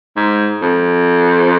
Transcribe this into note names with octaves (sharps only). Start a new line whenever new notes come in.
G#2
F2